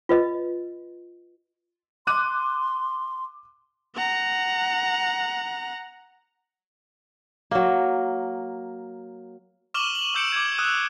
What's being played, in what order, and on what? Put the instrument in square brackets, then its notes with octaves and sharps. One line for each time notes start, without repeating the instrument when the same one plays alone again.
[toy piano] F4 B4 D#5
[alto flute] C6 [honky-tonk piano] D6 F#6 D#7
[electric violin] F#5 A#5
[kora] F#3 A#3
[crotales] C#6 D6 F6 E7 F#7 G7
F#7
D6 E6 G6 C#7 D7 F#7
D6 G6 G#6
D#6 E6 F#6 D#7